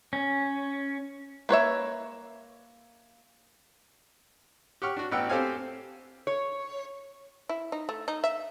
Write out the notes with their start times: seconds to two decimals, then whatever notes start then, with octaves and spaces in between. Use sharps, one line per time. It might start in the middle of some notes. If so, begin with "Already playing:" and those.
0.13 C#4
1.49 A#3 B4 C#5 E5
4.82 G4 F#5 C#6 F6
4.97 D4 F#4
5.11 A1 B3 F#5 G5 E6
5.29 C4 G4 A4 C5 F5 G#5
6.27 C#5
7.49 E4
7.72 D#4
7.89 A3
8.08 D#4
8.24 E5